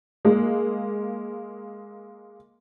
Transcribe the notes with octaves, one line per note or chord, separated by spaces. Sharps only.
G#3 A#3